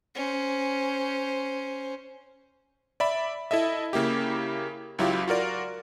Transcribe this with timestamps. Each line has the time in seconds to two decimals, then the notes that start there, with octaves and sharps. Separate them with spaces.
0.15 C#4 C5
3.00 D5 E5 B5
3.51 E4 A4 D#5 E5
3.93 C#3 A#3 E4 G4
4.99 C#2 F#3 E4 F4 G4 F5
5.28 F4 F#4 A#4 D5